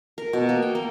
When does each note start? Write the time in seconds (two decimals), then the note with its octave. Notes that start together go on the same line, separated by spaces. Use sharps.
0.18 A#4
0.33 B2
0.49 A#3
0.62 G5
0.75 A#3